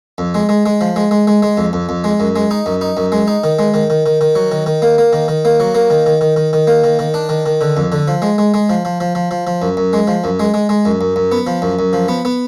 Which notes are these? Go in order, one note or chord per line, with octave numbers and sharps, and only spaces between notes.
F2
G#3
G#3
G#3
F3
G#3
G#3
G#3
G#3
F2
F2
F2
G#3
F#2
G#3
D#4
F#2
D#4
F#2
G#3
D#4
D#3
G#3
D#3
D#3
D#3
D#3
F#3
D#3
D#3
A#3
A#3
D#3
D#3
A#3
F#3
A#3
D#3
D#3
D#3
D#3
D#3
A#3
D#3
D#3
D4
D#3
D#3
D3
F2
D3
F3
G#3
G#3
G#3
F3
F3
F3
F3
F3
F3
F#2
F#2
G#3
F3
F#2
G#3
G#3
G#3
F#2
F#2
F#2
B3
F3
F#2
F#2
F3
B3
B3